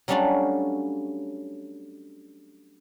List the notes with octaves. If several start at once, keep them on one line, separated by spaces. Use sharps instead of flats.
F#3 G3 A3 C#4 D4 F4